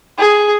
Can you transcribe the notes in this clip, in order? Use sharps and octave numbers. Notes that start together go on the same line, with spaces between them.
G#4